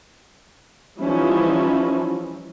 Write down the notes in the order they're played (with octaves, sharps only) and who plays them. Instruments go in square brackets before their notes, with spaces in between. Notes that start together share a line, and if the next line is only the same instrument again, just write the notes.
[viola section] E3 F3 G3 C#4 D#4 E4